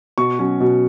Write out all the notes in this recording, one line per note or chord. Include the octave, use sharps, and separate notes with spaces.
B2 C#6
F#3 C#4
B2